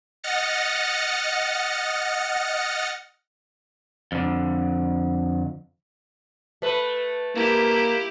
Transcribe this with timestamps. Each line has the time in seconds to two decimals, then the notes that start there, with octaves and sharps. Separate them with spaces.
0.24 D#5 F#5 F6 A6 A#6 C#7
4.12 F2 D3
6.62 A3 B4
7.35 A#3 E4 G4